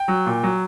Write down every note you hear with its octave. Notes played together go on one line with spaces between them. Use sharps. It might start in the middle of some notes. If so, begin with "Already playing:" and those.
Already playing: G5
F#3
A#2
F#3